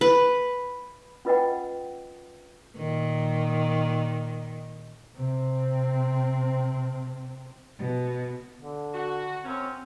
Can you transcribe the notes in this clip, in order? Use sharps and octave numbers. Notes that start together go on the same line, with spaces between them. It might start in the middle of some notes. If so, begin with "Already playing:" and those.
B4
C#4 F4 B4 D#5 F#5 G5
A#2 D#3
C3 C4
B2
D3
F#4
F#2 C4 C#4 C#5